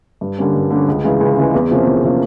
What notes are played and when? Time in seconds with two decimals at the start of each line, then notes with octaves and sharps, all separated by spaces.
0.21 G2
0.38 D3 G3 A#3 C#4
0.55 G2
0.71 D3 G3 A#3 C#4
0.88 C#2
1.04 C#3 E3 G#3
1.21 C#2
1.37 C#3 E3 G#3
1.54 E2
1.70 C3 F3 A#3 C#4
1.87 E2
2.04 C3 F3 A#3 C#4